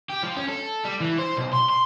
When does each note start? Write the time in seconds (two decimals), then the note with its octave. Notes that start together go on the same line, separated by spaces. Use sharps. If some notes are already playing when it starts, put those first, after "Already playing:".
0.09 G4
0.23 F3
0.36 C#4
0.48 A4
0.85 G3
1.01 E3
1.19 C5
1.37 B1
1.54 C6
1.70 C6